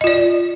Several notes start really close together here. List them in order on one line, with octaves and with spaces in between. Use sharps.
D#5 F4 D5